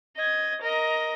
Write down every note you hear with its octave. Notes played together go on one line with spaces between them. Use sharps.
D#5 G#6
A#4 D#5